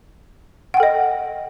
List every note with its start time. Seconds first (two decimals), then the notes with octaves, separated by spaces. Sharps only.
0.74 F#5
0.77 G5
0.80 A4
0.83 D#5